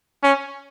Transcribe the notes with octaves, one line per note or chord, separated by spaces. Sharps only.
C#4